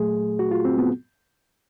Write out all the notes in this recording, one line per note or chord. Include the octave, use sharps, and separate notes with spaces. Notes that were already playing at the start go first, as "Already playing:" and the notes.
Already playing: A#2 F#3 A3 G#4
F#4
F4
C4
B3